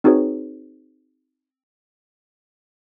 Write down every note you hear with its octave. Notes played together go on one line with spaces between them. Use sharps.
C4 D#4 F#4 G#4 B4 C#5